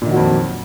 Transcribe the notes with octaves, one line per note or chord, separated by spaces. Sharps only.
F2 A#2 D#3 F#3